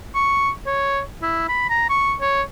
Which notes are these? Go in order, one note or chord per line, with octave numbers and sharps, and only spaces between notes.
C#6
C#5
E4
B5
A#5
C#6
C#5